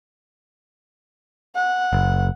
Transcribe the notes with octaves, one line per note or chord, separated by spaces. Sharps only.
F#5
F#1